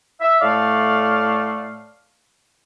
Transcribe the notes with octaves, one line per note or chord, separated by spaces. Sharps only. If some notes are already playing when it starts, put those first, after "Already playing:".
E5
A2 A3 D5 F5